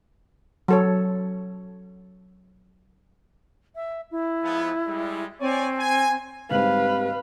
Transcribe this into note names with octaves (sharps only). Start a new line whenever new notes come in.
F#3 A4 C#5
E5
E4
F3 G#3 B3
G3 G#3
C4 C#5 D5 G#5
G#5
G#2 G3 C4 B4 F5